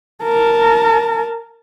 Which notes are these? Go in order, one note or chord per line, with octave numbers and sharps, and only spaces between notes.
A#4 A5